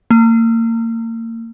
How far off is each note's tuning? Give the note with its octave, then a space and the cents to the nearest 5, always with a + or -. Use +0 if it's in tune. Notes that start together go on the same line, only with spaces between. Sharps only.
A#3 -35